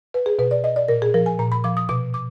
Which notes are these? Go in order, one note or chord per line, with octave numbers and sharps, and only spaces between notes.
B4
G#4
B2 B4
D5
D#5
D5
A#2 A#4
G#4
F3 A#4
G#5
A#2 A#5
B5
F3 D6
D#6
B2 D6
D6